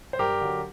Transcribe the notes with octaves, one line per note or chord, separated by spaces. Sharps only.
C5
G2 G4 A#4
D3 F#3